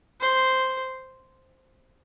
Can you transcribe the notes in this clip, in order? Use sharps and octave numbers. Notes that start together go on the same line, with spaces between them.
C5